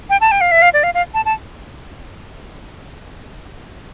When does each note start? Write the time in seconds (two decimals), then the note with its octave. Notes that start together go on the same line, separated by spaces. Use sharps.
0.10 G5
0.21 A5
0.32 G5
0.41 F5
0.52 E5
0.62 F5
0.74 D5
0.84 F5
0.94 F5
1.14 A5
1.26 A5